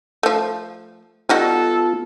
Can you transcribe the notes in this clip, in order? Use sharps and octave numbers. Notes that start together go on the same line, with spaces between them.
F3 A3
G3 B3 D#4 F4 F#4 A4